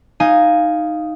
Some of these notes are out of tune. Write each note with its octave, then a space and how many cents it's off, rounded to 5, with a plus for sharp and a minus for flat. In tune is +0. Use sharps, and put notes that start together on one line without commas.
D#4 +0 F5 +0 G#5 +0